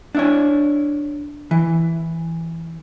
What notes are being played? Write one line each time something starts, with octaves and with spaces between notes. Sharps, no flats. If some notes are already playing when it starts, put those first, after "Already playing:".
D4 E4 C#5
E3